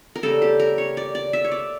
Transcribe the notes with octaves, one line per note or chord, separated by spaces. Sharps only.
A#4
C#3 G3 A#3 A4
G4
A#4
C#5
D5
D5
E5
C#5
D5